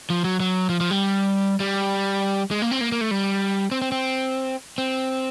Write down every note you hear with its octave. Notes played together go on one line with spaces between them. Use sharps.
F3
F#3
F#3
F3
F3
G3
G3
G#3
A#3
C4
A#3
A#3
A3
G3
C4
C4
C4
C4